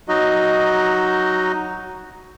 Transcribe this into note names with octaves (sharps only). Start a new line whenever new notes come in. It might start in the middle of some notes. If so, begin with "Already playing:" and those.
F#3 D#4 F#4 D#5